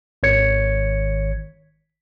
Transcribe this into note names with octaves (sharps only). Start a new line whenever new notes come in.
G#1 D#3 C#5 G#6 C#7